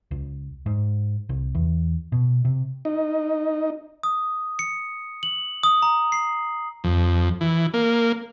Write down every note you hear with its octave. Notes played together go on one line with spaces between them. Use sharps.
C#2
G#2
C2
E2
B2
C3
D#4
D#6
C#7
F#7
D#6
A#5
C7
F2
E3
A#3